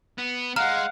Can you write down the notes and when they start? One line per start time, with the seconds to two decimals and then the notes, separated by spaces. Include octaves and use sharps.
0.18 B3
0.56 G#3 F5 F#5 A#5 F6